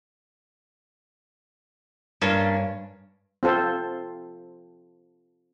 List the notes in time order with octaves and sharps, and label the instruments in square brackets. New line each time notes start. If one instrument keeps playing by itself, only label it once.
[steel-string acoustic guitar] G2 [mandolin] A#3 C#4 D4
[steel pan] C4 F4 A4 C5